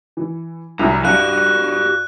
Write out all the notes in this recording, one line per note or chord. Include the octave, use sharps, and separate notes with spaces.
E3
C2 F#2 D4 E4 F#4 A#5
G2 F#4 G4 F5 F#6